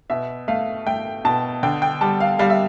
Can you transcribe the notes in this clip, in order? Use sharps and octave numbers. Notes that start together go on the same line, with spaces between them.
B2 E5
A3 F5
A3 G5
B2 A5
D3 G5
G5
G3 A5
F5
G3 F5
E5